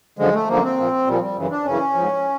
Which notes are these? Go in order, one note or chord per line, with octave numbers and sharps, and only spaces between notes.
F#2 D3 F3 G#3
A3
F#2 D3 F3 A#3
C4
A#2 F3
A#2 F3 G3
G3
F#2 C#3 E3
D4
F#2 C#3 E3 C#4
G#2 F3